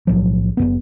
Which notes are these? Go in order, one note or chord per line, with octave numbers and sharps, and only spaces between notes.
B1 A2 F3 F#3
F#1 E2 B3